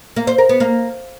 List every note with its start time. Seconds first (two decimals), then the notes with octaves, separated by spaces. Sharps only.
0.16 A#3
0.27 C5
0.38 A#4
0.49 B3
0.60 A#3